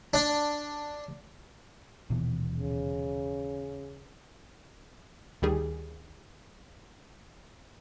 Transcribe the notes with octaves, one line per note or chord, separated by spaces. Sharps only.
D4
D#1 B2 E3
C#3
D2 D#3 G3 G#4